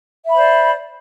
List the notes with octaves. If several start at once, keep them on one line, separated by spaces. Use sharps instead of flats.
C5 D5 E5 B5